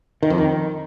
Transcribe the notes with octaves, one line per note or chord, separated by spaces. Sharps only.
D#3
F2
D#3